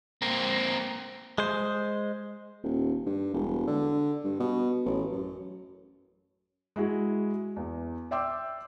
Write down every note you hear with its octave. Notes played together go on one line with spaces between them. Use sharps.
A#3 C4
G#3 C5
D#1
G2
E1
D3
G2
B2
A1
F#2
G#3 E4 F#4 G#4
E2
D5 E5 G5 C6 D6 E6